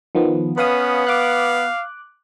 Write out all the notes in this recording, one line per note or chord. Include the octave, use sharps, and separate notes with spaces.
D#3 F3 B3
B3 C#4 B4 F5 D#6
F5 D6 F#6